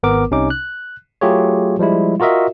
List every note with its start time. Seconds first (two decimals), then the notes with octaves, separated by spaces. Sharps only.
0.03 G#1 B3 A#4 D6
0.31 C2 C3 C#4 D#4 D6
0.50 F#6
1.21 F#3 A3 F4 G4 G#4 C#5
1.79 F3 G3 G#3 E4
2.20 F4 F#4 A#4 D#5 E5